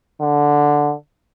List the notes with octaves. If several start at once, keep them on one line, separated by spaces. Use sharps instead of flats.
D3